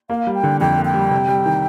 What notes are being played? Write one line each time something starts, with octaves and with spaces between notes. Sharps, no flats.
A#3 F5
G3
G5
D3
F2 G5
A#3
G5
G3
C3
G3
D#3